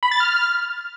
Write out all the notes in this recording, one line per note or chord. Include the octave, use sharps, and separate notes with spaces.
B5
A6
F6